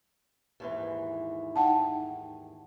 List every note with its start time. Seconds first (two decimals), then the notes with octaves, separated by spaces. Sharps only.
0.60 D#2 G#2 E3
1.56 D#4 F#5 G5 A5